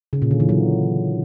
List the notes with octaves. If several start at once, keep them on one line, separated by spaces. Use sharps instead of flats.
C#3
A#2
D3
E3
F#3